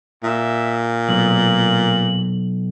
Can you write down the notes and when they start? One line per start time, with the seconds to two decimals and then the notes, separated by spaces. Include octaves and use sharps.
0.23 A#2 E5
1.09 B1 F#7